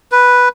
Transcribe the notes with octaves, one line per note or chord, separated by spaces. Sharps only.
B4